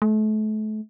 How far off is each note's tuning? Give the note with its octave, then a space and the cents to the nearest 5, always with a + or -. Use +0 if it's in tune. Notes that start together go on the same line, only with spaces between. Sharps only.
A3 -35